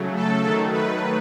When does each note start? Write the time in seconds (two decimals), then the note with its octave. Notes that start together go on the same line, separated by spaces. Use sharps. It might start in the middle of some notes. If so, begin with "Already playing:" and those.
Already playing: C#3 F#3 A3
0.16 A4
0.44 D#3 F#3 A3 A4
0.72 B4